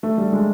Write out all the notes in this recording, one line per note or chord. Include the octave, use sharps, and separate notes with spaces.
A3
G3
G#3